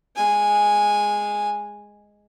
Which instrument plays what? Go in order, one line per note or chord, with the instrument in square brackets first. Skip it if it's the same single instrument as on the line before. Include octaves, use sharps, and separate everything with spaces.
[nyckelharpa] G#3 G#5